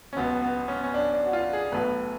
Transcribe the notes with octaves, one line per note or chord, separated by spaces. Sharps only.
C#4
C#2 B2 F#3 B3
B3
C#4
B3
C#4
D4
D4
F#4
F4
G#4
B1 A2 F#3 B4